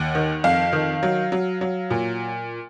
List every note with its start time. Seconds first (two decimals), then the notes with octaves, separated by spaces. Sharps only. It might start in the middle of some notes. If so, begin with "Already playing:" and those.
Already playing: D#2 F#5
0.15 D#3
0.44 F2 F5
0.73 D#3
1.03 F#3
1.32 F#3
1.61 F#3
1.90 A#2